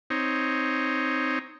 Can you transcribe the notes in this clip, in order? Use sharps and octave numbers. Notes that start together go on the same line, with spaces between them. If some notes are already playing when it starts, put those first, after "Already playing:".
C4 D#4 C#5